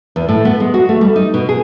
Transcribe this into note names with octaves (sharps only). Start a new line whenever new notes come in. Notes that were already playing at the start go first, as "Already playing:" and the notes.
E2
A2
B3
G#3
F#4
A3
G3
D#4
B2
G#4